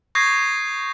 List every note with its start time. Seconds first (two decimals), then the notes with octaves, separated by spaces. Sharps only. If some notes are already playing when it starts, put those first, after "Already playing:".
0.15 C#6 D#6 G6 G#6 A#6 C7